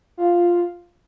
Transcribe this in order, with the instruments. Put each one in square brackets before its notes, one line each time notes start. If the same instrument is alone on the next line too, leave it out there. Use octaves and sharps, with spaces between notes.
[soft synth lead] F4